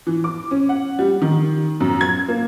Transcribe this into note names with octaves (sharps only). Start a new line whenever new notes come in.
E3
D6
C#4
F#5
G3
D#3
F#2
G#6
A#3